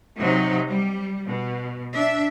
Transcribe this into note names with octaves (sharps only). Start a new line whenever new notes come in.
C3 F#3 D#4
G3
B2
D4 E5